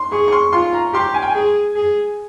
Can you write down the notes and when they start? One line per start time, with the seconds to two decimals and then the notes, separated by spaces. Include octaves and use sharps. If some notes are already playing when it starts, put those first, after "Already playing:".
Already playing: C6
0.12 G#4 C#6
0.28 C#6
0.32 C6
0.53 F4 C6
0.73 A#5
0.94 G4 C6
1.14 G#5
1.22 G5
1.29 G#5
1.35 G#4
1.76 G#4